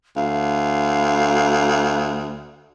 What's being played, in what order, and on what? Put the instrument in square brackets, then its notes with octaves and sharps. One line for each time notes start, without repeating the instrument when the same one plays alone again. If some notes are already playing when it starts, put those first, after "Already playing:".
[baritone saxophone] D2 [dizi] F5